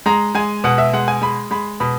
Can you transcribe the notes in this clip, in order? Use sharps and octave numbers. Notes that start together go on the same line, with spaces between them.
G#3 A#5
G#3 G#5
B2 F#5
E5
G#3 F#5
G#5
G#3 B5
G#3 B5
B2 B5